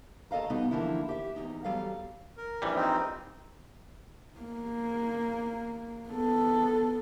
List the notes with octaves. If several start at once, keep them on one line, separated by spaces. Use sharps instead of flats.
D#2 A4 D#5 F5 A#5
B2 G3 B3 D#4
D3 E3 F3 A#3 D4 E4
G4 E5
E2 A#2 D#4
E2 F#3 G3 A4 D5 F5
A#4
A#1 E3 G3
C4 D#4
A#3
B3 A4